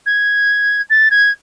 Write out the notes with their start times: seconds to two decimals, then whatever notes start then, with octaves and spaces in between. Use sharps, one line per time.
0.06 G#6
0.90 A6
1.11 G#6